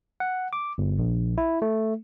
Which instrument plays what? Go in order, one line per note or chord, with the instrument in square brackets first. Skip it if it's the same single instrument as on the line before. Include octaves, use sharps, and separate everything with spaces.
[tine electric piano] F#5
D6
G1
A#1
E4
A3